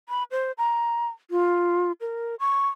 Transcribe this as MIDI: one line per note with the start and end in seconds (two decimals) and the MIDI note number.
0.09 0.23 83
0.31 0.52 72
0.58 1.07 82
1.31 1.92 65
2.01 2.35 70
2.40 2.68 85